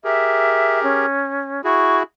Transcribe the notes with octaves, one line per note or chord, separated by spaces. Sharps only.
G4 G#4 A#4 E5
C#4
E4 F#4 G#4 C#6